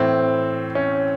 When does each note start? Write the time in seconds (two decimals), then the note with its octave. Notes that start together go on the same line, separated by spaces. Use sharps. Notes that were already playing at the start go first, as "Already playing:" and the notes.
Already playing: A2 E3 C4
0.75 C#4